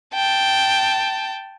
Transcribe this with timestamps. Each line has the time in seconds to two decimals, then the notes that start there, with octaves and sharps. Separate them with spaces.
0.14 G5 A5